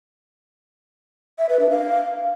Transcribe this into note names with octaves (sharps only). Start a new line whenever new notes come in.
E5
B4
D4
F5